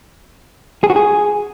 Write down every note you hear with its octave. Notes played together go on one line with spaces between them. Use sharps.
G#4
F#4
G#4